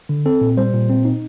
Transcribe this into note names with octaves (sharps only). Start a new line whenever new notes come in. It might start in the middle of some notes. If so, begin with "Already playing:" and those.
D3
C4 A4
A#2
G3 C5
A#2
C4
D#4